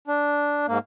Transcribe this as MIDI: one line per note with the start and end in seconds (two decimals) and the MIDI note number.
0.07 0.66 62
0.68 0.79 44
0.68 0.79 58